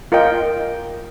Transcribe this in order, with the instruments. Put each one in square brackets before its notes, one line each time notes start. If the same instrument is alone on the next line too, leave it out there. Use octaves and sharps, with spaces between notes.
[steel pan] F4 A#4 D#5 G5